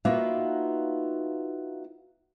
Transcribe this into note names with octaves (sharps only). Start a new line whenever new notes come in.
A#3 B3 D#4 F4 F#4 E5